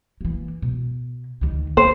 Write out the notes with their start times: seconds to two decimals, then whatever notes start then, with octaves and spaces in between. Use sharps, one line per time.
0.21 E3 A#3
0.62 B2
1.41 D2 D#3
1.77 C#3 C5